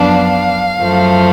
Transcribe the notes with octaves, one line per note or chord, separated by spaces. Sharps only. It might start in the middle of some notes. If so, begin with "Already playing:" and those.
Already playing: F#2 F3 B3 D4 F5
F#2 F3 A3